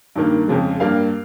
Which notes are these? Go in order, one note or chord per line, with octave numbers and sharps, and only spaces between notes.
G2 D#3 A#3
F2 C#3 F3 G#3
G2 G3 A#3 F5